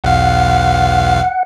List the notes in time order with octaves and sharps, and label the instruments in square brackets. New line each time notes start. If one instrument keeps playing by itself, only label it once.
[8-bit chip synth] B1 E2 F5 [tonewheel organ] F#5